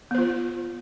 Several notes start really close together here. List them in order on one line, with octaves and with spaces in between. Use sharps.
B3 C5 F4